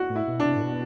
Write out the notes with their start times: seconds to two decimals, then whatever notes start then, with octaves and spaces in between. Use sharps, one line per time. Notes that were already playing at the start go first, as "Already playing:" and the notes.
Already playing: E4 F#4
0.10 A2
0.16 E4
0.28 B2
0.40 D4
0.45 C3
0.56 A2
0.63 B2